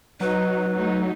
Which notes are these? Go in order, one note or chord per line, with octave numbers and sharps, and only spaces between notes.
F#3 D#4 B4
A3 D#4